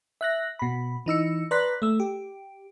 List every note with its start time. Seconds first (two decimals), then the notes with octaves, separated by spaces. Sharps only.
0.21 E5 F#6 A#6
0.59 B2 B5
1.06 E3 D#4 E6 C#7
1.51 B4 D5 A#5 C6 F#6 B6
1.82 A3 E6
2.00 G4